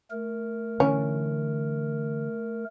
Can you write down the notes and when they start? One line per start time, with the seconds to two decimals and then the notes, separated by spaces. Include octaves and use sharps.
0.11 A3 A#4
0.80 D3 E3 C#4